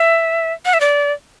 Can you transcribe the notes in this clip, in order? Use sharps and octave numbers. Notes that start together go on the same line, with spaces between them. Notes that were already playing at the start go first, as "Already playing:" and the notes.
Already playing: E5
F#5
E5
D5